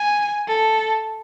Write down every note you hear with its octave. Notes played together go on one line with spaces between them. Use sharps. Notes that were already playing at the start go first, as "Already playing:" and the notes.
Already playing: G#5
A4